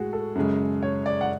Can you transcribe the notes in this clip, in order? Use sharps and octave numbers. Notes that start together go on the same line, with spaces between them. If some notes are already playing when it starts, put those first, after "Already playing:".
Already playing: A2 G#3 F#4 G#4
A4
F#2 C#3 G#3
C#5
D5
F#5